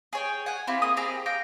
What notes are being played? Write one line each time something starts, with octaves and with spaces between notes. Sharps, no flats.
G#4 C#5 G5
F#5 G#5
C4 E4 F4 G4
A#3 G#4 D#6
C4 G4 G#4 A#5
F5 G5 A#5 D6